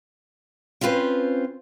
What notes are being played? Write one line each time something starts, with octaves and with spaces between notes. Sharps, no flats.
C4 C#4 F4 B4 C5